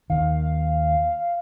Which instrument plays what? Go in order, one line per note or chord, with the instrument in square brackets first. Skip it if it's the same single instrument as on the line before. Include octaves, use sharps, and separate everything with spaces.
[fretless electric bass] D#2 D#3 [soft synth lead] F5